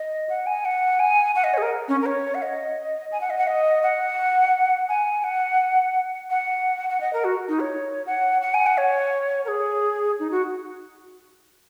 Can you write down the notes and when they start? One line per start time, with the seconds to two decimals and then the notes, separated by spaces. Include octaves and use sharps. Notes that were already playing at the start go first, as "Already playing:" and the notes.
Already playing: D#5
0.29 F#5
0.47 G#5
0.65 F#5
0.99 G#5
1.36 F#5
1.44 D#5
1.53 C#5
1.58 G#4
1.62 A#4
1.89 C#4
2.02 A#4
2.06 C#5
2.35 F#5
2.42 D#5
3.12 G#5
3.21 F#5
3.30 D#5
3.38 F#5
3.47 D#5
3.83 F#5
4.89 G#5
5.24 F#5
6.30 F#5
6.90 F#5
7.01 D#5
7.13 A#4
7.24 F#4
7.49 D#4
7.60 C#5
8.07 F#5
8.42 F#5
8.54 G#5
8.66 F#5
8.78 C#5
9.45 A#4
9.48 G#4
10.19 D#4
10.31 F#4